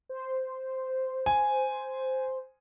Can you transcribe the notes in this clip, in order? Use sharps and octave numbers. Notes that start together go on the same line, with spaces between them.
C5
G#5